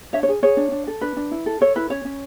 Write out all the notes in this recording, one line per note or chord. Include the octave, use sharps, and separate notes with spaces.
D4 C#5 E5
C#5
G#4
G#4 C#5
D4
D4
A4
D4 B4
D4
E4
A4
A4 C#5
E4 B4
C#4 C#5
C#4